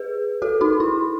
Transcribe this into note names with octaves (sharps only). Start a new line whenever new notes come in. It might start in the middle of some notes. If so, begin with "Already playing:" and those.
Already playing: G#4 B4
F#4 A4
D#4 F#4
E4